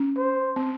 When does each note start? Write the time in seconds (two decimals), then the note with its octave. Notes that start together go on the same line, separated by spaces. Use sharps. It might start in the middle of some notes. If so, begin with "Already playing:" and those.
Already playing: C#4
0.17 C5
0.56 C4